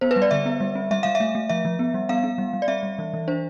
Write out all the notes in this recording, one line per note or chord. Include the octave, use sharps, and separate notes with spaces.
B3 C5
B4
G3
D5
D3 E5
B3
G3
C4
G3 E5
G3 F5
E5
A3
A3
F3 E5
F3
B3
G3
B3 F5
B3
G3
G3
D5
C4 E5
G3
E3
E3
D4 C5